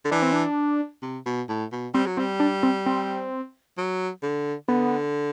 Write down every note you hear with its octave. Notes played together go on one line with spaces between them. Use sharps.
D3
E3 D4
C4
D4
C3
B2
A2
B2
G3 C4
F#3
G3 C4
D4
C4
C4
F#3
D3
D3 B3